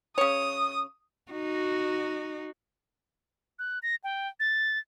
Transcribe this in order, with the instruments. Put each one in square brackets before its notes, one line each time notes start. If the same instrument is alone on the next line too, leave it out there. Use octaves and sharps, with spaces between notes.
[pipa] C#3 C#5 [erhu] D#6
[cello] D#4 [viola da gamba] F#4
[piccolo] F#6
A#6
G5
A6